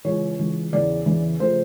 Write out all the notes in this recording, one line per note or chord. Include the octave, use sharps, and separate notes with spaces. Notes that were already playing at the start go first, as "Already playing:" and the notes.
C#2 C#3 E3 C#5
C#2 C#3 E3
E2 C#3 E3 D5
E2 C#3 E3
C#3 F3 A3 C5